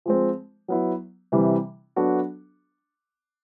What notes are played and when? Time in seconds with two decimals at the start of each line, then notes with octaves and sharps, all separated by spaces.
0.06 F3 G#3 C4
0.68 F#3 B3 E4
1.32 C3 E3 G3
1.96 F#3 B3 D4 F#4 A4